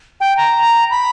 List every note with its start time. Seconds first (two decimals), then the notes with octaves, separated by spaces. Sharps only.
0.20 G5
0.37 A#5
0.90 B5